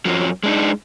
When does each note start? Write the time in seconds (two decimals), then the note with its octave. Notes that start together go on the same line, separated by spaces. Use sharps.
0.05 F#2 F3 F#3
0.43 G#3 D4 D#4